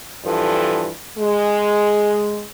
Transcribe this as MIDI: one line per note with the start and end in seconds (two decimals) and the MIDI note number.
0.25 0.89 43
0.25 0.89 52
0.25 0.89 53
0.25 0.89 69
1.18 2.44 56